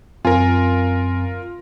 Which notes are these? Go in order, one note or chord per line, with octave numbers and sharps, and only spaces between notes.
F#2 C4 F4 A#4 G#5